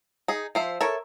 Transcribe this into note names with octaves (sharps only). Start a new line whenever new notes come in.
D#4 G#4
F3 C5 E5
A4 A#4 C#5 E5